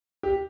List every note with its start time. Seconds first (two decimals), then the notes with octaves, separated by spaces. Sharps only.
0.23 G4